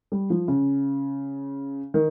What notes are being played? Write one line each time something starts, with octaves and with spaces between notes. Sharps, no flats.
G3
F3
C#3
D#3